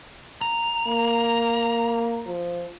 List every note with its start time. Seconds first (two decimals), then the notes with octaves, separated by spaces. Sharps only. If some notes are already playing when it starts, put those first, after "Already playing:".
0.41 A#5
0.87 A#3
2.26 F3